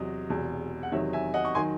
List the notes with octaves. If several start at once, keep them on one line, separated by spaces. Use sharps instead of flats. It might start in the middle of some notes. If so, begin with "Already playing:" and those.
Already playing: E2 C3 F#3 D#5
E1 E2 C3
F#5
E2 C3 D#3 F#3 C#5 E5
E5 G#5
D#5 F#5
C#6
D#3 F#3 G#5 C6